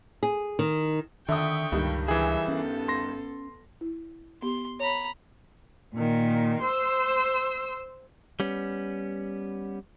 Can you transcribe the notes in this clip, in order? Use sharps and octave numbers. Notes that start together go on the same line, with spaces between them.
G#4
D#3
D3 D#3 E5 G5 C#6 D#6
C#2 G2 D#3 G3
E3 G#4 E5
B3 C#4 A4
C6 A#6
E4
B3 G4 C6
C#5 A#5 B5
A#2 D#3
C5 C6 E6
G3 B3 C#4